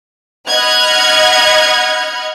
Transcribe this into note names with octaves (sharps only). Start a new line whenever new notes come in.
D#5 F#5 B5 F6 F#6 G#6